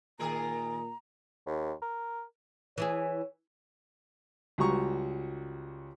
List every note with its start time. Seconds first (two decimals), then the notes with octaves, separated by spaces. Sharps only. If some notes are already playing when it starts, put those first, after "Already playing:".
0.20 A#2 D#3 G#4 A#4 A#5
1.46 D#2
1.82 A#4
2.78 E3 E4 G#4 C#5
4.58 C#2 G3 F#4 A#5 C#6